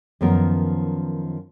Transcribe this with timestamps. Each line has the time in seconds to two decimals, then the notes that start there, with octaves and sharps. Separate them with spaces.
0.21 F#2 D#3 F3 B3 A#4